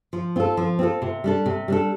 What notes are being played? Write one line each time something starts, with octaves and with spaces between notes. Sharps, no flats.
F3
C4 F4 A4
F3
C4 F4 A4
C3
G3 D4 A4
C3
G3 D4 A4